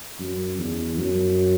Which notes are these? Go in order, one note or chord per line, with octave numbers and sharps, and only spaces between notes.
F#2
E2
F#2